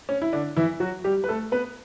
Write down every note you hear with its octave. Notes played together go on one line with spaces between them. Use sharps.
C#4
E4
D3 D4
E3 E4
F#3 F#4
G3 G4
B4
A3 A4
B3 B4